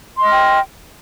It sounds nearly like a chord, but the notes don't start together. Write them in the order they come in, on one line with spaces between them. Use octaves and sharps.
C6 D#5 F6 G5